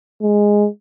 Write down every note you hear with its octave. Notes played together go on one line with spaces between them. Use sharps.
G#3